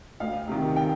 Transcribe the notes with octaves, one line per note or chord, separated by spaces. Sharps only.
D2 F5
C3 D#3
G5